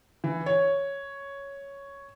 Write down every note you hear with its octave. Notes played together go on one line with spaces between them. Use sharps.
E3
C#5